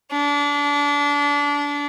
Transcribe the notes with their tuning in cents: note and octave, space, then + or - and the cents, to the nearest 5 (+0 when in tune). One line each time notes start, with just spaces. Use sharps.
D4 -25